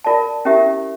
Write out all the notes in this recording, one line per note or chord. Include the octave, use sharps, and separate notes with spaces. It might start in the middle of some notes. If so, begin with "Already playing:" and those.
F4 A#4 D5 A5
C#4 E4 G4 A#4 E5